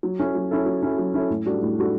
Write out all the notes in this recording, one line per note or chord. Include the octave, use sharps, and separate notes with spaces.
F#3
C#4 E4 A4
F#3
C#4 E4 A4
F#3
C#4 E4 A4
F#3
C#4 E4 A4
A2
G3 D4 F#4 A4
A2
G3 D4 F#4 A4